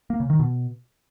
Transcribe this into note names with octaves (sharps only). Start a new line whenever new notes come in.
A#3
C#3
D#3
B2